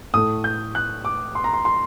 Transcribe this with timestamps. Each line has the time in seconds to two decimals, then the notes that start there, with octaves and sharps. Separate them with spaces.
0.14 A2 A3 D#6
0.44 G6
0.75 F#6
1.05 D6
1.35 C6
1.44 A#5
1.53 C6
1.65 C6